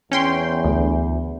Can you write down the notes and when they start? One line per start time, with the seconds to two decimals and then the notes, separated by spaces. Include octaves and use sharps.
0.12 E2 C#4 G5 C6
0.64 D2